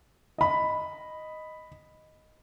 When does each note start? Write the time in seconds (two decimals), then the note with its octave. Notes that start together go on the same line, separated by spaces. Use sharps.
0.38 D#5 B5